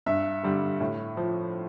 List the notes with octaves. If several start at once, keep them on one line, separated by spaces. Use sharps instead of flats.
G2 E5
D3 G3
A2
F3